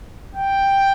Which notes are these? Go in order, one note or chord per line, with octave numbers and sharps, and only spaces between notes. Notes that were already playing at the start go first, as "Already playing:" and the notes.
G5